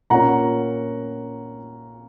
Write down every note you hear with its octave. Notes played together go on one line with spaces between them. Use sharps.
A#2 A#3 C#4 F#5 A#5